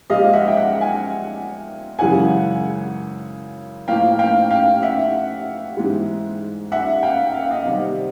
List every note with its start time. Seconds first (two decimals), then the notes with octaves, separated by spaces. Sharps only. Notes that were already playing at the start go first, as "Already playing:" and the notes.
0.10 A#2 F3 G#3 D#5 F5
0.33 E5 F#5
0.48 G5
0.57 E5 F#5
0.80 F#5 G#5
1.99 F#2 C#3 E3 G#3 F#5 G#5
3.88 A2 F3 A#3 F5 G5
4.19 F5 G5
4.50 F5 G5
4.82 E5 F#5
5.77 G#2 E3 G#3
6.72 E5 F#5
7.03 F5 G5
7.34 F5
7.43 F#5
7.51 D#5 F5
7.66 C3 D#3 G3